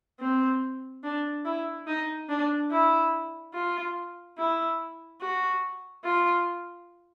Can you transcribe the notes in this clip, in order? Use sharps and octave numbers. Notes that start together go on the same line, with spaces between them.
C4
D4
E4
D#4
D4
E4
F4
E4
F#4
F4